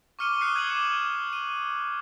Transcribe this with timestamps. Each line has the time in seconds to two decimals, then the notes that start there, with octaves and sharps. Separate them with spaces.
0.19 C#6 D6 F6 C#7 D#7 G7
0.41 D#6 F#6 C7 C#7 G7
0.56 G#6 D#7 F#7
0.67 D6 C#7 E7 F#7
1.33 D#7